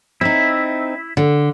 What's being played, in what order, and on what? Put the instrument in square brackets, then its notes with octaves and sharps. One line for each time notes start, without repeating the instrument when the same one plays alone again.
[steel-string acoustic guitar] C4 D#4 [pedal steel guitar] E4 E5
[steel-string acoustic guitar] D3